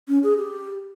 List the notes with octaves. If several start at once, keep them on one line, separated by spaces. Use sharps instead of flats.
C#4
G#4
G4